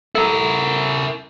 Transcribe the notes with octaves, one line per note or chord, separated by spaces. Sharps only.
E4 A4 A#4